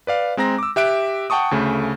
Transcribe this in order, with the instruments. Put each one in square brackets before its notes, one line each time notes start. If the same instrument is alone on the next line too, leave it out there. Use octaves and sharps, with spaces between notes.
[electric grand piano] B4 D5 F5
G#3 C4 A#5 A#6
D6 E6
G4 E5 F#6 D7
F#5 G5 A5 C#6 D#6
D2 C#3 A3